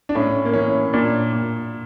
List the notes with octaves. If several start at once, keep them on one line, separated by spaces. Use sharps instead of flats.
D4
A2 C#4
A#3
E3 C#4
A#2 D4
A#2